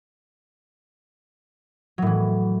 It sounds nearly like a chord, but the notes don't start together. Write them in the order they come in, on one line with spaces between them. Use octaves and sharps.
F#3 A2 E3